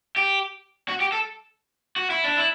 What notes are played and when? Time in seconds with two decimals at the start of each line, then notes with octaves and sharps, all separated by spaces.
0.16 G4
0.88 F#4
1.00 G4
1.12 A4
1.96 F#4
2.10 E4
2.24 D4
2.37 E4